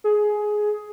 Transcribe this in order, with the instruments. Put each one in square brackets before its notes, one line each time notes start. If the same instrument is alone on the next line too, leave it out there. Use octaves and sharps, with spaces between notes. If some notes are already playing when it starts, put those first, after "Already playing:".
[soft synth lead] G#4